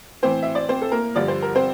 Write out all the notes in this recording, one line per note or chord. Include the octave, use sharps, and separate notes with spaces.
A2 E3 C4 C5
E5
D5
C4 C5
A4
A#3 A#4
G2 D3 F3 D5
C5
A#4
C4 C5